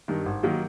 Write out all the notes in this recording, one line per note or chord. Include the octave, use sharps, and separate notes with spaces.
G2 D#3
G#1
D#3 F#3 A#3